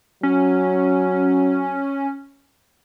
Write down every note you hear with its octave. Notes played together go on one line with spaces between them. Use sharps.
F#3 C#4